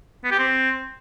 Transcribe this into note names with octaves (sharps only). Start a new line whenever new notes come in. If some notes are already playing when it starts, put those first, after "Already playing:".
B3
G4
C4